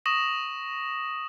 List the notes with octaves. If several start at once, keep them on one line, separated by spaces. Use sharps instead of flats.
C#6 D#6 A#6 E7 F#7